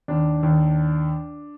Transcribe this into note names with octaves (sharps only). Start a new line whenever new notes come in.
D#2 D4
D#2